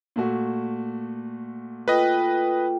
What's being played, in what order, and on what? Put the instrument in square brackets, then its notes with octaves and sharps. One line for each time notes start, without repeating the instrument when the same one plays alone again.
[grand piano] A#2 A3 F#4
[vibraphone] F4 A4 G5 [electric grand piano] B4 D#5